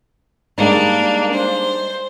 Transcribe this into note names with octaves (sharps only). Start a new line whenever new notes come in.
G3 G#3 A#3 D4 D#4
C5